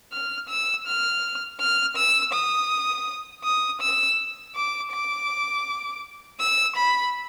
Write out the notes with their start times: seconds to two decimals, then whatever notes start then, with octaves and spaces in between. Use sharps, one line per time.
0.12 F6
0.49 E6
0.86 F6
1.60 F6
1.97 E6
2.34 D#6
3.44 D#6
3.81 E6
4.55 D6
4.92 D6
6.40 E6
6.76 B5